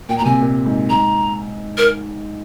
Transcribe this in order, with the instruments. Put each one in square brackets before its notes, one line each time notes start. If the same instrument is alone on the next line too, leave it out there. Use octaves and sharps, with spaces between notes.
[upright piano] A#2 [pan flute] G5
[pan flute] A#5
[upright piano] A#2
[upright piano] C3 [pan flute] G#5
[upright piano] A#2
G#2
[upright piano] G#2 [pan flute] A#5
[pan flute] A#4